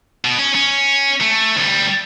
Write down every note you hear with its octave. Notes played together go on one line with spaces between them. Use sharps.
B2
C#4
C#4
A3
D2 G3